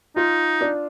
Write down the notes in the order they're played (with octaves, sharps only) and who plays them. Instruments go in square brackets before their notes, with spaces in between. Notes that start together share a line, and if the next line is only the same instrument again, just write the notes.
[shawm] D#4 [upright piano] F4
[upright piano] D4